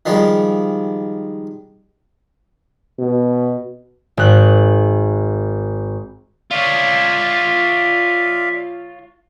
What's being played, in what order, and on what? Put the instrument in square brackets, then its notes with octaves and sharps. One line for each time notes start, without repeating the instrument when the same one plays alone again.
[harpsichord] D#3 F3 G3 G#3
[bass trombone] B2
[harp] G#1 F#6
[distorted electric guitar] F4 C#5 [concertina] D5 E5 F5